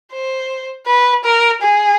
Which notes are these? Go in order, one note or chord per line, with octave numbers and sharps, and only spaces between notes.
C5
B4
A#4
G#4